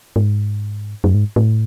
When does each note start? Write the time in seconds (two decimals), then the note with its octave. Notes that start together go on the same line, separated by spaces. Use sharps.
0.16 G#2
1.04 F#2
1.14 G#2
1.36 A2